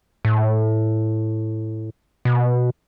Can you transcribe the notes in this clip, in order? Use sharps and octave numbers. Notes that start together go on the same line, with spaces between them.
A2
B2